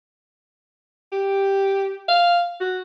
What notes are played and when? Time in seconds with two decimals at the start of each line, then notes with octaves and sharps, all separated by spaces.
1.12 G4
2.09 F5
2.60 F#4